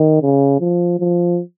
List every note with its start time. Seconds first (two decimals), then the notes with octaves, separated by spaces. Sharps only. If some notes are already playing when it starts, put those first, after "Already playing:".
Already playing: D#3
0.22 C#3
0.60 F3
1.00 F3